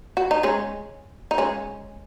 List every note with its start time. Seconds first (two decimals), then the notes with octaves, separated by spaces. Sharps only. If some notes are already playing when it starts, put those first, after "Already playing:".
0.17 F#4
0.31 D#4
0.43 G#3 C#4
1.31 D#4
1.38 G#3 C#4